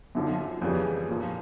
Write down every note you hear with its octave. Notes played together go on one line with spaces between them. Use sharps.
F#2 D3 F3
F2 C#3 E3 G3
A#2 F3